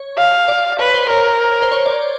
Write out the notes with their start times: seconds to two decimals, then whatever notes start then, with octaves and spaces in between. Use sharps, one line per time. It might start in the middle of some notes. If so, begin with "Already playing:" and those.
Already playing: C#5
0.18 F5
0.48 D5
0.79 B4 C#5
0.94 C5
1.10 A#4 C#5
1.62 C5
1.72 C#5
1.86 D5